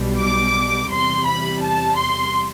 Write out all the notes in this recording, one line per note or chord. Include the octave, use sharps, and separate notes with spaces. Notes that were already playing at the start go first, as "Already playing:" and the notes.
Already playing: B1 B2 G3
D6
E2 C3 G3 C6
B5
A5
C6